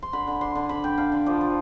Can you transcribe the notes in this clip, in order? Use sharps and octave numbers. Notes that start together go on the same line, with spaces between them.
C6
D3 B5
D3
D4 C6
D3
D3 B5
D3 G5
D4 F5
D3
F3 D5
F3